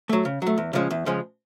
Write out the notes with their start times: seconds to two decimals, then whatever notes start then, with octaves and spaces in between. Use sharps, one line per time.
0.09 F#3 A3
0.25 C#3
0.42 F#3 A3
0.58 E2
0.73 C#3 F3 G#3 C#4
0.91 E2
1.06 C#3 F3 G#3 C#4